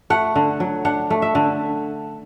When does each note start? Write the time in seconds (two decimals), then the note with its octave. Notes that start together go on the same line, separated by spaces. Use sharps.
0.10 A3 F#5
0.35 D3
0.60 F#3
0.85 D4 F#5
1.10 A3
1.22 E5
1.35 D3